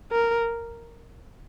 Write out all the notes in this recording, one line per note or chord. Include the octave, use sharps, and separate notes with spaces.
A#4